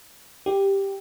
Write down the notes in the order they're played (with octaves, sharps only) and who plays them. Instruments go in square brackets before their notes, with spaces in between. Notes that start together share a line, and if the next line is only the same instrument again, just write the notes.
[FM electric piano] G4